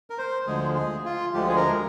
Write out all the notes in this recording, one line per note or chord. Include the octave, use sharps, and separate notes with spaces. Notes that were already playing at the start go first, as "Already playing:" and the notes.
A#4
C5
D2 D3 F3 G#3 G#4
G#4
F4
D2 D3 F3 G#3 G4
G#4
A#4